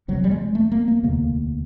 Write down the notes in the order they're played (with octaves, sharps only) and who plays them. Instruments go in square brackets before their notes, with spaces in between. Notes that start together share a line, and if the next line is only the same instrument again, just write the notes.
[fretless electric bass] E1 E2 C3 F#3
G3
G#3
A3
A#3
A#3
E1 D2 C3 A#3